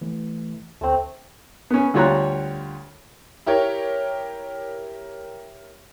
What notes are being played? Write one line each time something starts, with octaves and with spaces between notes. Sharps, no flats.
E3 A3
D2 A3 C4
B3 C#4
D2 G3 F4 C#5 A#5 F#6
E4 G4 A#4 C#5